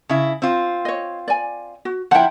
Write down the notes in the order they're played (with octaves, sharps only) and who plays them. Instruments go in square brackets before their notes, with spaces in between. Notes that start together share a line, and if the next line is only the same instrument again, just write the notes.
[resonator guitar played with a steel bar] C#3 E4
C4 F4
[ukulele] C#5 D#5
D5 G#5
F#4
[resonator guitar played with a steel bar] F3 E4 [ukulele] F#5 G5